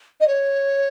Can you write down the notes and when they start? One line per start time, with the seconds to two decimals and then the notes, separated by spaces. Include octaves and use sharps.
0.20 D#5
0.27 C#5